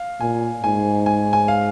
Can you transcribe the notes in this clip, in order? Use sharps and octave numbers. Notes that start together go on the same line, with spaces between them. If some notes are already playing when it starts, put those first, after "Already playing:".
Already playing: F5
A#2 G#5
G#2 G#5
G#5
G#5
F5